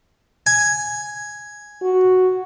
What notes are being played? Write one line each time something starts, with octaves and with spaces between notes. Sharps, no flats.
G#5
F#4